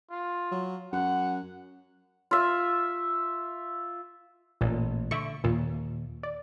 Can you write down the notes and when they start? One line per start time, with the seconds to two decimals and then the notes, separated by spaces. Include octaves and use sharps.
0.11 F4
0.51 F#3
0.93 F#2 F#5
2.31 F4 E5
4.61 A1 A#2
5.11 D3 E5 C#6
5.44 D#2 A#2
6.23 D5